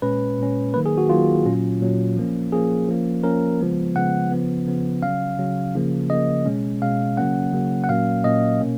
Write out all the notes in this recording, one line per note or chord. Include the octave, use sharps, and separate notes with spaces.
A#2 G#3 C#4 B4
A#2 G#3 C#4
D#3 F#3 A#3 B4
G#4
F#4
D#3 F#3 A#3 F4
A#2 F#3 C#4
A#2 F#3 C#4
F3 A#3 C#4
F3 A#3 C#4 G#4
F3 A#3 C#4
F3 A#3 C#4 A#4
C#3 F3 G#3 B3
C#3 F3 G#3 B3 F#5
C#3 F3 B3
C#3 F3 B3
C#3 F#3 C#4 F5
C#3 F#3 C#4
C#3 F3 A#3
C#3 F3 A#3 D#5
B2 G#3 C#4
B2 G#3 C#4 F5
C#3 F#3 A#3 C#4 F#5
C#3 F#3 A#3 C#4
F#5
A#2 F#3 A#3 C#4 F5
A#2 F#3 A#3 C#4 D#5
B2 A#3 C#4